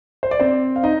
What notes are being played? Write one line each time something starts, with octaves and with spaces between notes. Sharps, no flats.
C5
D5
C4 C5
F5
D#4 D#5